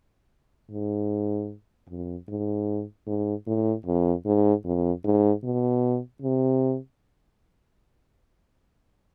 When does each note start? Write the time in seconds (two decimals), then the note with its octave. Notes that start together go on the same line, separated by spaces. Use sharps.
0.71 G#2
1.89 F2
2.28 G#2
3.07 G#2
3.47 A2
3.86 F2
4.26 G#2
4.65 F2
5.04 G#2
5.44 B2
6.22 C3